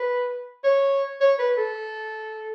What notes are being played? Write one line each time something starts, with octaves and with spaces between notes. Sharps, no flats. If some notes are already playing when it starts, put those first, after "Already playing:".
Already playing: B4
C#5
C#5
B4
A4